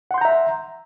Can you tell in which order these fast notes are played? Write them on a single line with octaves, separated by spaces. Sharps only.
F#5 C6 G6 A#5 E5